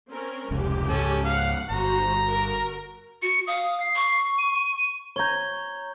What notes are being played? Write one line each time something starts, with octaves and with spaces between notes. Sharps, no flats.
C4 C#4 A#4
F1 C#2 C#3 G#3 G4
C#2 G#2 C#3 C#4 A4
F5 F#5
G1 F#4 C5 A#5
F#4 A#4
F#4 C#7
F5 D#6
C7
C#6
D#7
C#5 A#5 G6 G#6 G7